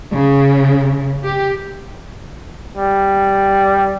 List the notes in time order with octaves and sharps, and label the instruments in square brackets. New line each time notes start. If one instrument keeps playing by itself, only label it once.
[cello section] C#3
G4
[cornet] G3